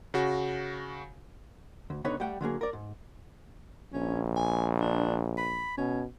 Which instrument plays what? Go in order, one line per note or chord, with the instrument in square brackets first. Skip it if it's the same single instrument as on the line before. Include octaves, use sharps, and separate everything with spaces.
[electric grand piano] C#3 F#4
[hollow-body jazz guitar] D2
C#2 D3 B3 D#4 B4 C#5
G3 A3 F#5 G5
D3 F#3 A#3 G#4
A#4 D5
G#2
[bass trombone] A#1 [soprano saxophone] C#4
[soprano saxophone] G#5
D4
B5
[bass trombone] B2 [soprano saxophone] C#4